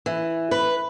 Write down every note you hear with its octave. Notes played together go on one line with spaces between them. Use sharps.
E3
B4